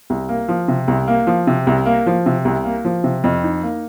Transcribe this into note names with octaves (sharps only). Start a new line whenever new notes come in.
C2
A#3
F3
C3
C2
A#3
F3
C3
C2
A#3
F3
C3
C2
A#3
F3
C3
F2
D#4
A#3